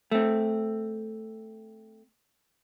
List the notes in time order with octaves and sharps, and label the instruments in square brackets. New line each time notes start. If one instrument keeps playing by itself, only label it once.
[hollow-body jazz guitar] A3 C4